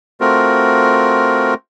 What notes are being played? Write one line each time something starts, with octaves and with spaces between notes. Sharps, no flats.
A3 C4 F4 F#4 A#4